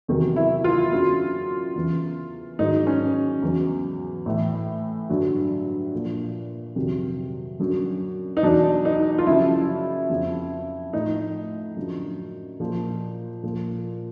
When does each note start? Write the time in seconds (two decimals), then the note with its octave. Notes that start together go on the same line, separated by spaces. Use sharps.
0.08 E2 C3 D#3 F#3
0.36 E4
0.64 F4
0.92 F#2 D3 F#3
1.76 E2 C#3 E3
2.59 G#2 D#3 F#3 D#4
2.87 C#4
3.42 E2 C#3 F#3
4.26 A2 E3
5.09 G2 D3 F#3
5.93 A#2 F3
6.76 F2 C3 D#3 F#3
7.59 F#2 D3 F#3
8.37 D#4
8.43 E2 B2 F#3 D4
8.85 D#4
9.18 F4
9.27 F#2 C#3 F3 E4
10.10 F2 C#3 F3
10.93 A2 F3 D#4
11.77 F#2 D3 F3
12.60 A#2 F3
13.44 A#2 F3